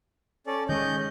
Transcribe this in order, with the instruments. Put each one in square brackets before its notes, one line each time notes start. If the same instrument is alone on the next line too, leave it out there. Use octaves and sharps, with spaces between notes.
[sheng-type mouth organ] C#4 A4 D5
[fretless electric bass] D#3 G#3 [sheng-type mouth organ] C#4 D#5 G6